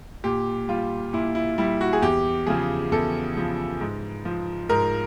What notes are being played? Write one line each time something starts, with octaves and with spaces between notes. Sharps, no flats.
A#2 G4
G3 F4
A#2 E4
E4
G3 E4
F#4
G#4
E2 G4
C#3 F3 G#4
E2 A4
C#3 F3
G#2
F3
G#2 A#4